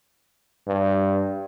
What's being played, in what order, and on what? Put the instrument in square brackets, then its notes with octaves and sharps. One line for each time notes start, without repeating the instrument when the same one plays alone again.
[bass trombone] G2